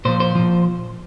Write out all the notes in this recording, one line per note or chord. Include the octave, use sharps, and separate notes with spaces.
A#2 F3 C5
C5
A#2 F3